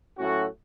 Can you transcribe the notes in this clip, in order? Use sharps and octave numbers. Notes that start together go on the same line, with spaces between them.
A2 F#3 A3 C#4 F#4